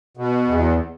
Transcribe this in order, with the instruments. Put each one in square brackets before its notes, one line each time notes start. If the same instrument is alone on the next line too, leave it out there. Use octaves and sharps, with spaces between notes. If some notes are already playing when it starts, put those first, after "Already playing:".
[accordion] B2
E2